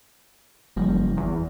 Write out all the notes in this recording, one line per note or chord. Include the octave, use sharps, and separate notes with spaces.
F#1 F3 G3 A#3
E2